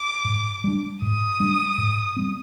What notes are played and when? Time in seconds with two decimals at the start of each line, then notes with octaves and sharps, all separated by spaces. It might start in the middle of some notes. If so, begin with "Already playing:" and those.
Already playing: D6
0.25 G#2
0.64 G3 D4
1.02 G#2 D#6
1.40 G3 D4
1.78 G#2
2.17 G3 C4